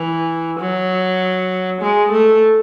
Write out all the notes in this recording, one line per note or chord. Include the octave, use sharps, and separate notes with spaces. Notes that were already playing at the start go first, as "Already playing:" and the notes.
Already playing: E3
F#3
G#3
A3